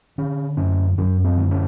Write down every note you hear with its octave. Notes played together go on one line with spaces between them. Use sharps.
D3 C#4
F#2 C#4
F#2 C#4
C4
D3
C#4